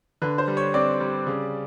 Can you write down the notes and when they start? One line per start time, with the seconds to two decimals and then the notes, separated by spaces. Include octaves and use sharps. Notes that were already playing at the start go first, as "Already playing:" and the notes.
0.22 D3 B4
0.38 C5
0.48 G3
0.57 C#5
0.74 C4 D5
1.00 G3
1.27 C#3